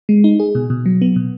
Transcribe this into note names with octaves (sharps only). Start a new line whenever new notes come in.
G#3
D#4
G#4
B2
B2
F#3
B3
B2